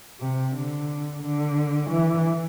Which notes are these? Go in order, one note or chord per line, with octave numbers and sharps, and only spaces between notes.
C3
D3
D3
E3